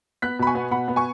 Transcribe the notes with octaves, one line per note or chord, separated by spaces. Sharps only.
B3 F#6 B6
B2 B5
G#5 C#6
B3
B2 F#5 B5
B3
G#5 C#6